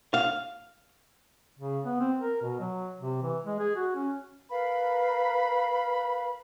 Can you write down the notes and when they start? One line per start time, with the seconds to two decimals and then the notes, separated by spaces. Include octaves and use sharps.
0.14 F5
1.59 C#3
1.85 B3
2.00 C4
2.20 A#4
2.42 B2
2.60 F#3
2.99 C3
3.23 E3
3.45 G#3
3.60 G#4
3.76 F#4
3.96 C#4
4.51 A#4 B4 F5 B5